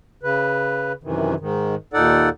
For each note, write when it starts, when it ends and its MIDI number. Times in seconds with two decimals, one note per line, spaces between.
0.23 0.92 49
0.23 0.92 71
1.04 1.34 42
1.04 1.34 48
1.04 1.34 51
1.04 1.34 52
1.40 1.75 44
1.40 1.75 51
1.94 2.29 39
1.94 2.29 46
1.94 2.29 63
1.94 2.29 69
1.94 2.29 74
1.94 2.29 78